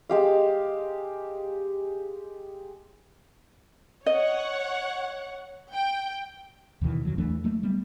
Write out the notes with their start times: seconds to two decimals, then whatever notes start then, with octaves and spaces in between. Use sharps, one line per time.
0.10 G#3 G4 F5
4.06 C#5 D#5 F#5
5.73 G5
6.81 D#2 B2 D#3 E3
7.05 F2 D#3 F#3
7.18 E2 E3 A3 D4
7.44 F#3 A3 A#3
7.63 G3 A3 B3